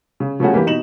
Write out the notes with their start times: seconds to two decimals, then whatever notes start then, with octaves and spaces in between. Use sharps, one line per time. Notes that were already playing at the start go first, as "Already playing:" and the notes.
0.20 C#3
0.40 C#3 F3 G3 A3 C#4 F#4
0.54 E3 A#3 G4
0.67 B2 D#4 E7 F#7